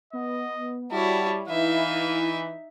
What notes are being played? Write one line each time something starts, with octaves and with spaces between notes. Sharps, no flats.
B3 D#5
G3 E4 F#4 C#5 A5
E3 D#4 E4 E5 F5